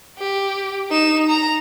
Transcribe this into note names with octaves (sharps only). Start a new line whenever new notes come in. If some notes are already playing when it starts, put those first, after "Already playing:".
G4
D#4 E7
A#5